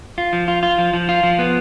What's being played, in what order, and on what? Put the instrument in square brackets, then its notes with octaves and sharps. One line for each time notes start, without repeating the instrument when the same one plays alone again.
[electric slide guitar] F4
F3
F4
F4
F3
F3
F4
F3
B3